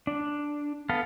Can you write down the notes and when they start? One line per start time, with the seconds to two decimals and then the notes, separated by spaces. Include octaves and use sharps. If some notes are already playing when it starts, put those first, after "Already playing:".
0.07 D4
0.89 B3 A4 F5